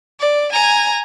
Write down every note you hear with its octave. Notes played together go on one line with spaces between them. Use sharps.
D5
G#5 A#5